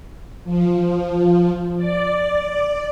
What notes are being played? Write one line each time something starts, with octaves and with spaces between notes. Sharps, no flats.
F3
D5